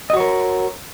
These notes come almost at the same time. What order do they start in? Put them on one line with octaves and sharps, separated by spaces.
D#5 F#4 C#5 A#4